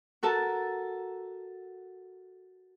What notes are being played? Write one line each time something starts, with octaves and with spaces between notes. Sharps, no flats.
F#4 A4 A#4 A5